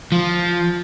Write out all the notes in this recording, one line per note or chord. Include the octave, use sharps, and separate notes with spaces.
F3